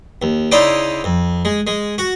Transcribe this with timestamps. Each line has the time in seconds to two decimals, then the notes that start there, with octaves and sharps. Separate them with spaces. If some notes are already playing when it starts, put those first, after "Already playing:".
0.22 D#2
0.52 C#3 D#4 E4 C5 D5 G5
1.04 F2
1.45 G#3
1.67 G#3
1.98 F#4